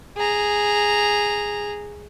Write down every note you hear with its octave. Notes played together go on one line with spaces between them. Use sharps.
G#4 A#5